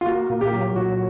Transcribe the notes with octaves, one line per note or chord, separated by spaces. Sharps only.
F4
A#3 F#4
A#2
G4
F#3
A#2 F#4